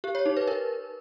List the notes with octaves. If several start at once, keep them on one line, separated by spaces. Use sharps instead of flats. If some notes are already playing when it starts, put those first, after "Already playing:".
G4
C#5
D#4
B4
A#4